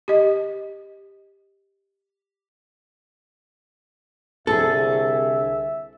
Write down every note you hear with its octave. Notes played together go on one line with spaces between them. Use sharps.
G4 D#5
C2 D3 G#4 A4 E5